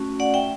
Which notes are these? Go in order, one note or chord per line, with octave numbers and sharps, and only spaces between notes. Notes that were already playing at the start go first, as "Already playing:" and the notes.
Already playing: A3 C#4 F#4
D5 F#5
E5 G5